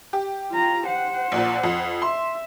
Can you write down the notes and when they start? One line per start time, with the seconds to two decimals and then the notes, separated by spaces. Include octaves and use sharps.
0.13 G4
0.51 F4 A#5
0.86 C5 F#5
1.32 A#1 A#2
1.63 F2
2.02 E5 C6